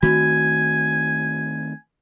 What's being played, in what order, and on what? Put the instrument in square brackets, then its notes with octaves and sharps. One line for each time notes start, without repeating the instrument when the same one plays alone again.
[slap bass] D#3 A3 C4 [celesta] F#4 [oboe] G#5